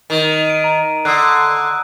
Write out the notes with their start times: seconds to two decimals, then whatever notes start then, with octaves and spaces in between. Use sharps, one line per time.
0.10 D#3
0.47 D7 D#7
0.64 A#5
1.05 D3 D#6 E6 F#6